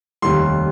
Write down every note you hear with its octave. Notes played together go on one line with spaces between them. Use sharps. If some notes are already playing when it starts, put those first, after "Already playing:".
F1 D#2 D#3 G3 C6